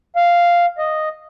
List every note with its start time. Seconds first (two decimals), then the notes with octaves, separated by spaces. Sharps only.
0.16 F5
0.79 D#5